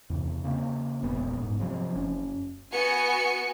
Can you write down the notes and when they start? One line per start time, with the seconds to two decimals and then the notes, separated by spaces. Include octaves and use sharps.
0.10 E2 C3
0.43 C#3 A#3 C4
1.03 E1 A#1 B3
1.40 G#2
1.60 C3 F3 F#3 C4
1.95 F#1 C#4
2.72 B3 F#4 G#5 C#7